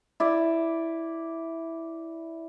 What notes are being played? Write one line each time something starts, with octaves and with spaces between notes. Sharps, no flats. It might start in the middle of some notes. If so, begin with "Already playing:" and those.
E4 D5